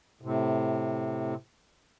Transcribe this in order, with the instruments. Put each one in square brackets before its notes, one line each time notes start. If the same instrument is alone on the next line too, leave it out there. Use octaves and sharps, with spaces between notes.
[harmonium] A2 C3